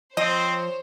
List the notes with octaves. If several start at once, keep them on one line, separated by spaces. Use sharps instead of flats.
F3 C4 C5 C#5 D#5